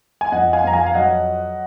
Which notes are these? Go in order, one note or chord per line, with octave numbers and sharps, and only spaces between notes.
G#5
F2 D#5 F#5
F5 G#5
F2 A#5
F5 G#5
F5
F#3 D#5 F#5